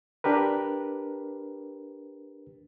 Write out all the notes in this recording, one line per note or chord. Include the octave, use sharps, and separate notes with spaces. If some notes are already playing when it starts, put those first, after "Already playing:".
D4 G4 A#4 B4